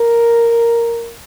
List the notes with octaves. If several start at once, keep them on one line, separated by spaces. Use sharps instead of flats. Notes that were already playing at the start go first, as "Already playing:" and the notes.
Already playing: A#4